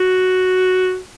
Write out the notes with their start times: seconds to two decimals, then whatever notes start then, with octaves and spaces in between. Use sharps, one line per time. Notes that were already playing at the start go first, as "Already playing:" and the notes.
Already playing: F#4